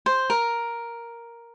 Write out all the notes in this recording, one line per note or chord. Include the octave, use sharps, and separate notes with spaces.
C5
A#4